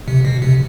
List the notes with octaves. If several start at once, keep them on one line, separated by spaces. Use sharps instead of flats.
C3
B2
C3